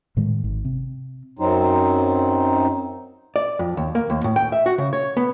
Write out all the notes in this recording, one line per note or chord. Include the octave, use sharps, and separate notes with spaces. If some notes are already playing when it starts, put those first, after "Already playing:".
A2 D#3 G#3
G#1
C3
F#2 F#3 C4 D#4
D5
F2
D#2
A#3
D#2
A2
G5
E5
F#4
C#3
C#5
B3